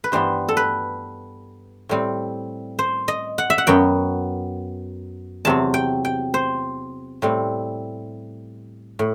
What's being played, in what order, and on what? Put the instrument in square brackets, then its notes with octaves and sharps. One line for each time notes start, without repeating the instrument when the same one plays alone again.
[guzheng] B4
G2 E3 G3 B3 C5
A4
B4
A2 G3 C4
C5
D#5
F#5
E5
F#5
F#2 F#3 B3 G5
E2 C3 F#3 C4 A5
G5
G5
C5
A2 G3 C4
A2